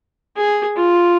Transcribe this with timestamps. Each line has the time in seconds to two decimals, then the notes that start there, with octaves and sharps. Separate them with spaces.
0.37 G#4
0.76 F4